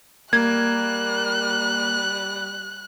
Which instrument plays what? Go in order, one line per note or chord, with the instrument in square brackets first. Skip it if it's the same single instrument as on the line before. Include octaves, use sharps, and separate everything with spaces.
[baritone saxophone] G3 [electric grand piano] A#3 [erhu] F#6 [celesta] G#6